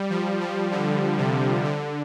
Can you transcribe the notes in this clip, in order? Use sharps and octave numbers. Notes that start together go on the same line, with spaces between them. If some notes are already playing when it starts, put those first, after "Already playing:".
Already playing: G3
F3
F3
D3
C3
D3